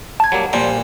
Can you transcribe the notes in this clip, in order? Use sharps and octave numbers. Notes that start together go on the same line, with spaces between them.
A5 G#6
F#3 G3 A#3
A#2 F3 G3 C5